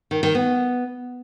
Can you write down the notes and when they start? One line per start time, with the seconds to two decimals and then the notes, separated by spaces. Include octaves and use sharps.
0.11 D#3
0.23 D#3
0.35 B3